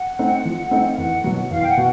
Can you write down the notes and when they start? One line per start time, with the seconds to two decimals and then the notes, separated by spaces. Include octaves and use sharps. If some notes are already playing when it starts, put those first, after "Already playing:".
Already playing: F#5
0.19 A3 C4 D#4
0.45 F3
0.71 A3 C4 D#4
0.93 F5
0.98 E2 F#5
1.24 B2 F#3
1.51 E2 F5
1.62 G5
1.69 F#5
1.77 B2